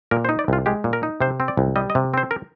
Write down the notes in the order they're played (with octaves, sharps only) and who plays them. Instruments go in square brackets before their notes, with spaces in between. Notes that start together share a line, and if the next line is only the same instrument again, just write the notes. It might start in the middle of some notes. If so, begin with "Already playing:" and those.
[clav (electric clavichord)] A#2 A#4
C5
D#4
D5
C2 F4
G#3 G4
A#2
A#4
D#4
C3 C5
C4
D5
C2
G3 D#5
D#5
C3
C4 C5
A#4